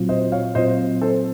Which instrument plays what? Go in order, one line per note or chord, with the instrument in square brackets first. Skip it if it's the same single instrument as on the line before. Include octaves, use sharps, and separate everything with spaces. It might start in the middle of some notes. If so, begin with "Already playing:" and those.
Already playing: [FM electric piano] A#2 F#3 C4 F4
[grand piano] C5 D#5
C#5 F5
[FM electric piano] A#2 F#3 C4 F4 [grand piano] C5 D#5
[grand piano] A4 C5